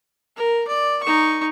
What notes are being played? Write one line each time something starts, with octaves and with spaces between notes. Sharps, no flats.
A#4
D5
D#4 C#6